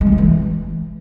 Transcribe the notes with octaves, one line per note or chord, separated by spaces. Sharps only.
G#3
D3
C#3
E3
G#3